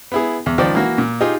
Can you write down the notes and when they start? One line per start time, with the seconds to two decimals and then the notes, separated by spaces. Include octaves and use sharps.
0.12 B3 E4 G#4
0.46 E2
0.58 C#2 D#3 F3 D5
0.75 E3 A#3 F#4
0.98 A#2
1.21 D#4 F4 G4 G#4